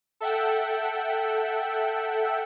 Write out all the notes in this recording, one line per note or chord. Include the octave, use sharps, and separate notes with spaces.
A4 E5 F#5 G5